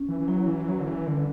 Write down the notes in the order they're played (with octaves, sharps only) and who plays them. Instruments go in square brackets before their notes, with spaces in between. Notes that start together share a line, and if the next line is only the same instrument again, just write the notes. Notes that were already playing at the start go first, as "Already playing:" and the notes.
Already playing: [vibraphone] C#4
[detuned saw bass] E3
E3
[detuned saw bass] F#3 [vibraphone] E4
[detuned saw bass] E3
[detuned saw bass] F#3 [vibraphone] B4
[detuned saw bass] D3
E3
[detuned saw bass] D3 [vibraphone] G3